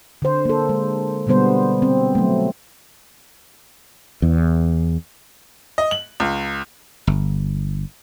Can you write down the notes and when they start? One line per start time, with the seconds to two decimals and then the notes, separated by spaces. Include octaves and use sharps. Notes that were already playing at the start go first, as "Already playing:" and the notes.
0.22 D3 C5
0.45 A#3 A4
0.69 G#3
1.27 B2 D3 G3 B3 C5
1.82 C4
2.15 F#3 A3
4.22 E2
5.78 D#5
5.91 F#7
6.20 C#2
7.07 G1